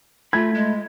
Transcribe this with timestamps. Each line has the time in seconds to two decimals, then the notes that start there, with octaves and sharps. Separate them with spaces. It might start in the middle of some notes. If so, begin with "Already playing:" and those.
0.33 A3 F4 B5 G#6
0.54 G#3